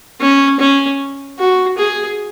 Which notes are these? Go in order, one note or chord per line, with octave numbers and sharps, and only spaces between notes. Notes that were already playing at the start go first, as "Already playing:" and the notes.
C#4
C#4
F#4
G#4